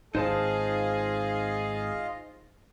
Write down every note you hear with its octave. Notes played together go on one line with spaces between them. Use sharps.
G#1 D#4 F4 G#4 C5 D#5 F5 A5